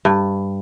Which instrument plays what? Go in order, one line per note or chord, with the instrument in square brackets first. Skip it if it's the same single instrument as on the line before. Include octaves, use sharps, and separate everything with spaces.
[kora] G2